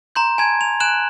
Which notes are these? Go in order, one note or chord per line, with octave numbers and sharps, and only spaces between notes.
A#5 C6 G6
G#5 A5 G#6
F7
G#5 F#6 E7 F#7